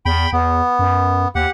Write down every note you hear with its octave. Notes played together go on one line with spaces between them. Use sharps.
E2 G5 B5
E2 B3
F#2
D#2 G4 F#5